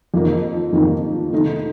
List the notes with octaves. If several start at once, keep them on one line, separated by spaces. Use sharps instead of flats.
F2 D#3 A#3 D#4
F2 D#3 A#3 D#4
D#3 A3 D#4